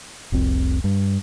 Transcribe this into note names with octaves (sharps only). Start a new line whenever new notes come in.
F1 C2 C4
G2